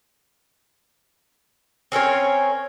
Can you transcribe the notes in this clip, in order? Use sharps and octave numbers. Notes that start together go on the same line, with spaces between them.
C4 C#4 A#4 C#5